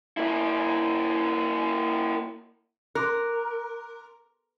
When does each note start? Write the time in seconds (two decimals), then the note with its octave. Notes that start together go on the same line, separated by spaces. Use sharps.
0.17 A#3 E4
2.95 A#4 C6 D6 F#6